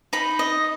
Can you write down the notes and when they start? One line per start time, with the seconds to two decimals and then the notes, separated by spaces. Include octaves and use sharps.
0.13 D#4 B5
0.39 D#5